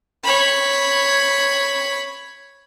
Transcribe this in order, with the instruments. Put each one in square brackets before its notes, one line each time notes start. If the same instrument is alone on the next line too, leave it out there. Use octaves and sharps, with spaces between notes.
[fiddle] C#5 B5